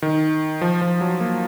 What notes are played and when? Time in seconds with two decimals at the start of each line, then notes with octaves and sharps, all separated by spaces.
0.02 D#3
0.61 F3
0.82 F3
1.01 F#3
1.20 A#3